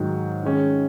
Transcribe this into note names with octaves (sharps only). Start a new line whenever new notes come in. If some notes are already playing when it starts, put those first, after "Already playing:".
Already playing: G#2 D#3 F#3
D#3 G#3 C#4